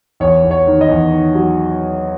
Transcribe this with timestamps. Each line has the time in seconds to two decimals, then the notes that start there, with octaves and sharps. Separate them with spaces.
0.20 E2 C#5
0.43 E2
0.51 C#5
0.67 D#3
0.81 D#5
0.89 E2
1.12 D#3
1.35 F#3